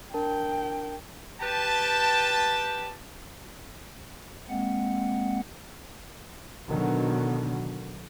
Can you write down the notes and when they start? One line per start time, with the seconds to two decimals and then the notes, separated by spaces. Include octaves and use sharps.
0.14 D4 A#4 G5 A5
1.41 G4 B4 G5 A5
4.49 G#3 A#3 C4 F#5
6.69 B2 D3 D#3 F#3